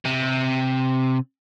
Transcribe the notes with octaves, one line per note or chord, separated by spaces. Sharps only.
C3